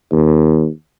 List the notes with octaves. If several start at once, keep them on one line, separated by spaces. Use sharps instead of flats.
D#2